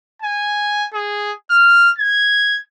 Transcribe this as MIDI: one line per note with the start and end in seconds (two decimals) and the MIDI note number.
0.22 0.88 80
0.93 1.32 68
1.51 1.90 89
1.98 2.60 92